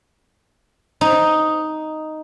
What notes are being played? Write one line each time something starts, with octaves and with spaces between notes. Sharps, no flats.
D#4